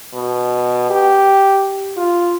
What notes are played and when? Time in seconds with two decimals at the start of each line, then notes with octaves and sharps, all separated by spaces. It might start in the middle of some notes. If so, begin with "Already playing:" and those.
0.14 B2
0.90 G4
1.97 F4